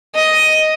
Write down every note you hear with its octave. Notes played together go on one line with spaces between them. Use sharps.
D#5